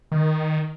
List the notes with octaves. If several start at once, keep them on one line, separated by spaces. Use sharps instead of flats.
D#3